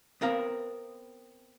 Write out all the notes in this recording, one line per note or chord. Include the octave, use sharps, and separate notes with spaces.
B3 C4 A#4 F5